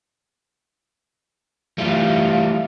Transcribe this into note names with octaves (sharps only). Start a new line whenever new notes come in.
E3 G3 A3 F4